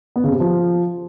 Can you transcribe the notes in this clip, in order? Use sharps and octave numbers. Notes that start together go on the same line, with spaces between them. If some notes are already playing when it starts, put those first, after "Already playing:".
B3
C#3
C3
F3